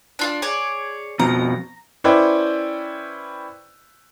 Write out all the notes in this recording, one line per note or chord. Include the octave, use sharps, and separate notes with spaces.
D4 F4 A5
G#4 C#5 D5
F2 B2 F3 A#5
C#4 E4 B4 C5 D5 G5